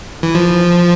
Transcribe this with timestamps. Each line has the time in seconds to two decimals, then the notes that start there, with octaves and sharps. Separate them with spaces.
0.23 E3
0.35 F3